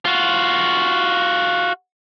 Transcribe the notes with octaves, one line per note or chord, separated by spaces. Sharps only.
F4 F#4